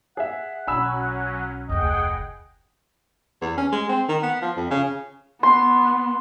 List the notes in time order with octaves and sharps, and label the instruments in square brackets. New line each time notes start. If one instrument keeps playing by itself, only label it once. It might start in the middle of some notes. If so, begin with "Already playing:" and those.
[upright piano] G#4 E5 [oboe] F#5
[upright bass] B1 [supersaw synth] F#3 C#4 [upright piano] G#5 B5 E6
[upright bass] F1 D2 [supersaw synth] G#4 F#5 G5 [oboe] D#5
[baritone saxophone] E2
C#4
G#3
C4
D#3
B3
F3
F2
C#3
[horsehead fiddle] B3 [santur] C6